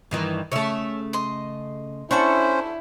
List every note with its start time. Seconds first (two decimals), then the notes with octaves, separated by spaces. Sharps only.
0.11 G2 D#3 E3
0.52 C#3 A3 C#5 E5
1.13 D#5 C6
2.11 C#4 D4 E4 A4 C5 F#5 C#6